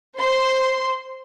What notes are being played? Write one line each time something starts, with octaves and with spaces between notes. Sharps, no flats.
C5 C6